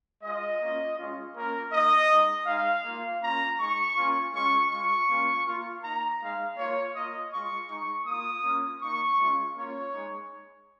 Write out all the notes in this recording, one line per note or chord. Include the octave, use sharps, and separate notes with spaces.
G#3 F4 D#5
A#3 C#4 F4
G#3 C#4 F4
A#3 C#4 F4 A#4
A#3 D#4 D#5
G#3 D#4
G#3 D#4 F5
A#3 F4
A#3 C#4 F4 A#5
G#3 D#4 C#6
A#3 C#4 F4
G#3 C#4 F4 C#6
G#3 F4 C#6
A#3 C#4 F4
A#3 F4
A#3 D#4 A#5
G#3 D#4 F5
A#3 F4 C#5
A#3 F4 D#5
G#3 F4 C#6
G#3 D#4 C#6
A#3 F4 D#6
A#3 C#4 F4
A#3 D#4 C#6
G#3 C#4 F4
A#3 C#4 F4 C#5
G#3 D#4